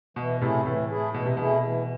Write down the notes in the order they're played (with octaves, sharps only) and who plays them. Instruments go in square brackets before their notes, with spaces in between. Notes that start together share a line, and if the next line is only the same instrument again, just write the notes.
[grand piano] B2 [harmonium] E3
[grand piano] A2 C3 [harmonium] A3 E4 G#4
[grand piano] A2 [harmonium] E3
[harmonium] A3 E4 G#4
[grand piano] B2 [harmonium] E3
[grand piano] C3
[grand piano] B2 [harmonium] A3 E4 G#4
[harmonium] E3